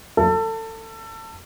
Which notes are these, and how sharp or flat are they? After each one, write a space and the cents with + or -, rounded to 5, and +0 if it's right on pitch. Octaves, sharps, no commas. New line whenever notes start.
A4 +25